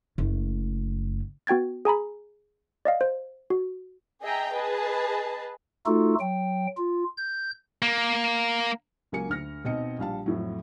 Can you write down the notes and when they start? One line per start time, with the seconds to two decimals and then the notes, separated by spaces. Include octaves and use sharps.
0.18 F#1 A3
1.47 B3 F#4 G5 G#6 A6
1.85 G#4 G#5 A#5 B5
2.85 D5 D#5 F5
3.01 C5
3.50 F#4
4.22 G#4 D#5 E5 G5 A#5
4.54 G#4 B4 D#5 A5
5.86 A3 D#4 F4 F#4 A4
6.20 F#3 G5
6.77 F4
7.18 G6
7.82 A#3
9.12 C#2 F#3 A#3 G#5 C#7
9.30 D2 F6 A#6
9.65 B2 C4 D#4 D#5 C#7
9.99 A#1 G3 F5 A5
10.26 F2 A2 F#3